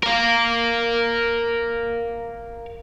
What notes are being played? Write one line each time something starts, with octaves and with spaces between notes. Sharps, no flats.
A#4 F5